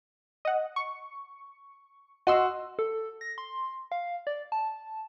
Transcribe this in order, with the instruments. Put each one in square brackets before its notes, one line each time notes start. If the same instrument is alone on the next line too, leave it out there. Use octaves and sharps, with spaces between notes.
[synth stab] D#5 F#5
C#6
[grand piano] F#4 [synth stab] D#5 C6 E6
[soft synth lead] A4
A#6
C6
F5
D5
A5